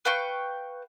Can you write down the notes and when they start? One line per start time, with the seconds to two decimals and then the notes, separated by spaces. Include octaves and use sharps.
0.05 B4 F5 G5 C#6